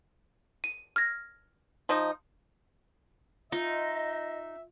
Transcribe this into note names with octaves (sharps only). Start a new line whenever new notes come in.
D#7
F6 G#6 A#6
F3 D#4
D#4 F4 D#5 E5